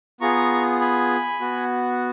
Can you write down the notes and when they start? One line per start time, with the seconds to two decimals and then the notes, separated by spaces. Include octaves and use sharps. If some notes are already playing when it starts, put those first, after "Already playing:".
0.21 B3 F4 G#4 A#5 C#6
0.81 G#5 B5
1.41 B3 F#4